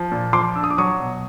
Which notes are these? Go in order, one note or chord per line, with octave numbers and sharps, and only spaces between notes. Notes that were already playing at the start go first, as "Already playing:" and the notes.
Already playing: F3
A#2
F3 C6 D6
D4 E6
D#6
D6
F#3 C#6 D#6
B2